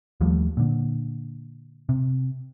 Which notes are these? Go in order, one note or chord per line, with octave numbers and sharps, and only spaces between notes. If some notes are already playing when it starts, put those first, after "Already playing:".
D#2 F3 G3 A3
A#2 D3
C3